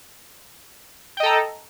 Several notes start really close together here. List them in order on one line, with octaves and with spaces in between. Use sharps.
G5 D#5 A4 A#5